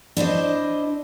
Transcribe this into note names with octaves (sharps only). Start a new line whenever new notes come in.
D4 E4 C5 D#5